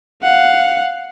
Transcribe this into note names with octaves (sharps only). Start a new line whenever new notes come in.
F5 F#5